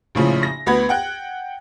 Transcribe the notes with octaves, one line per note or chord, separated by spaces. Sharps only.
A#1 A2 C#3 F3
A#6
D2 B3 F#5 B5 G#6
F#5 G5 F#6